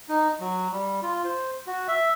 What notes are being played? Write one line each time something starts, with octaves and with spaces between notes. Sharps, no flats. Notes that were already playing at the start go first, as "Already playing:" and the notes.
D#4
F#3
G3
F4
C5
F#4
E5